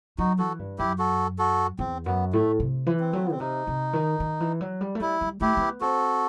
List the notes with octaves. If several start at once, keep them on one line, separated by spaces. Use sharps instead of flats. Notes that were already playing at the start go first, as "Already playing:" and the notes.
F#3 D#4 F#4
E3 F#4 A4
G2
F#2 E4 G4
F#4 A4
F#4 A4
E2 C4
F#2 B3
A2 A3
C3
E3
C4
F#3 A3
B3
B2 C4
C3 D#4
C3
D#3
D#3
E3
F#3
G3
A3
G3 E4
G3
A3 E4 G4
C4
B3
C4 F#4 A4